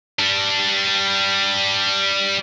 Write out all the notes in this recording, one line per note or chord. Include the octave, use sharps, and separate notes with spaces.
G3 D4